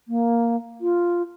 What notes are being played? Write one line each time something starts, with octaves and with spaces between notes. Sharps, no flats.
A#3
F4